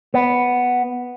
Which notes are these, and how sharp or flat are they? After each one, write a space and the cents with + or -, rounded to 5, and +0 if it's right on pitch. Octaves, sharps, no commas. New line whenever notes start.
B3 +0